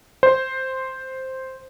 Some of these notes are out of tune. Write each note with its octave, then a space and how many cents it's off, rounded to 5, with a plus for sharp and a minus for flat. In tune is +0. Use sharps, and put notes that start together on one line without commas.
C5 +0